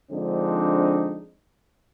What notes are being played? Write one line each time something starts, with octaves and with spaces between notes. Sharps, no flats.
D3 F3 G#3 C4 D4 D#4